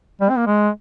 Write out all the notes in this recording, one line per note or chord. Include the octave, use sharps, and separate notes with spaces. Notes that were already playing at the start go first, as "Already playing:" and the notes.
G3
C4
A#3
G#3